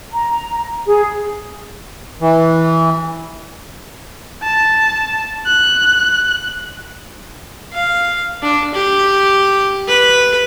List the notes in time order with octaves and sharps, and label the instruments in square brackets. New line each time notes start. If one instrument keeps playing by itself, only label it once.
[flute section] A#5
G#4
[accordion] E3
[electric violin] A5
F#6
[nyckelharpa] F5
D4
G4
B4